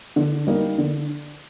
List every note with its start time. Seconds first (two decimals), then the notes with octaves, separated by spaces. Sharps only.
0.16 D3
0.47 G3 A#3 D#4
0.78 D3